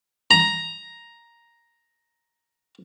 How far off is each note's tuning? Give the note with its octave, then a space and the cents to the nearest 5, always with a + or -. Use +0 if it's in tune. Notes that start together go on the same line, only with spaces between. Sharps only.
A#5 +5